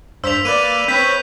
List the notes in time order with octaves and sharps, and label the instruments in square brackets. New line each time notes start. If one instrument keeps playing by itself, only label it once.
[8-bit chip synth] G2 C5 [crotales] E6 B6 F7
[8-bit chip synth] A#3 B4 D5 [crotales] D#7
[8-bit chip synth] C4 B4 C#5 [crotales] G6 B6